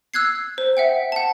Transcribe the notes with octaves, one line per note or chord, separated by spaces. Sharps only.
E6 F#6 G#6 C7
C5
E5 F#5 G5
F#5 A5